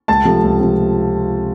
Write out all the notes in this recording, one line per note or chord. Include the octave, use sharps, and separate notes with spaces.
C#2 A5 A6
C3 F3 A3
C#2
C3 F3